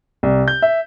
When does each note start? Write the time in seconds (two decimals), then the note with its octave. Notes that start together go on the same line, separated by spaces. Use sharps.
0.23 C2
0.48 G6
0.62 E5